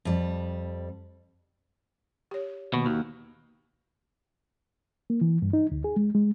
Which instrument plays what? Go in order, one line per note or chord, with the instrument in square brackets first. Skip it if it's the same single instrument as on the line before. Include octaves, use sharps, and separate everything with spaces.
[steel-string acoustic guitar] F2 G3
[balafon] G4 C#5
[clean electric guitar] B2 [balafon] D#3 A#3
[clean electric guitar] D#2 [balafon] F#4
[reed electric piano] A#3
E3
G2
D#4
D2
G#4
G#3
G#3